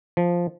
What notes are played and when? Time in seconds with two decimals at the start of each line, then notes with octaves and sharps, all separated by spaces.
0.17 F3